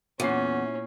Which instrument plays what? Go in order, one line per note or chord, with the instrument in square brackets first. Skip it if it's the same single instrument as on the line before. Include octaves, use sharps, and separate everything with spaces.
[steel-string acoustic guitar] E2 [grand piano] A#2 F#5 C7 [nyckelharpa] C#4